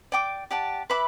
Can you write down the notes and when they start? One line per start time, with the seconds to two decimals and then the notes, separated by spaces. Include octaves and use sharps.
0.12 D5 G5 D6
0.51 G4 D5 F#5 A5
0.90 B4 E5 B5 D6